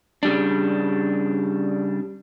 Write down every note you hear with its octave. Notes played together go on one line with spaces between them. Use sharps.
C#3 G3 D4